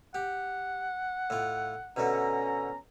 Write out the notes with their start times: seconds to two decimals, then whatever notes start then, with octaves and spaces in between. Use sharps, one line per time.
0.15 G4 F#5
1.30 A2 F4
1.96 B2 D3 A3 C#4 A#5